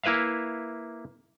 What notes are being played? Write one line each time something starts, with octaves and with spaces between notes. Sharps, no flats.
A#3 E4 B4 E5 F5